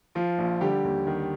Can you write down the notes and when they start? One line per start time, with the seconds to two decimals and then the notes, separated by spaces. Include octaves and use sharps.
0.15 F3 F4
0.39 A#1
0.61 D3 G3 G4
0.84 D#2
1.07 D#3